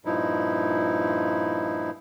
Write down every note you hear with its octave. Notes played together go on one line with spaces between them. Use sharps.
G2 A#2 F3 D#4 E4